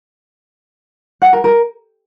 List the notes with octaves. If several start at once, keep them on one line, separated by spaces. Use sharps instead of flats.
F#5
A#4
A#4